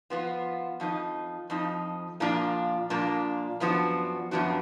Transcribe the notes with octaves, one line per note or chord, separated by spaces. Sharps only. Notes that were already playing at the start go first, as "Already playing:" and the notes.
F3 B3 F4
F2 F3 D#4
F2 F3 D#4
A#2 F3 A#3 D4 F4
A#2 F3 A#3 D4 F4
F#2 F3 B3 D4 F#4
F#2 F3 B3 D4 F#4